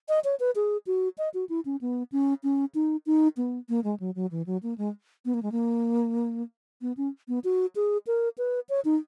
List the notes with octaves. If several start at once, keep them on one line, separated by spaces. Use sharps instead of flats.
D#5
C#5
B4
G#4
F#4
D#5
F#4
E4
C#4
B3
C#4
C#4
D#4
D#4
B3
A#3
G#3
F#3
F#3
E3
F#3
A#3
G#3
B3
A#3
G#3
A#3
B3
C#4
B3
F#4
G#4
A#4
B4
C#5
D#4